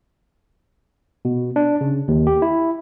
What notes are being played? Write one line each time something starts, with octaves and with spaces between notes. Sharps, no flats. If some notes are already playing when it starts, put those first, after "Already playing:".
B2
D4
C#3
D#2
G4
E4